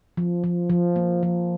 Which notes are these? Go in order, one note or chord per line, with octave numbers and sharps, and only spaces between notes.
F3
F3
F3
A#3
F3